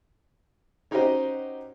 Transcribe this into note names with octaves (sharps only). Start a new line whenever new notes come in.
C#4 D#4 F#4 G4 C5 D#5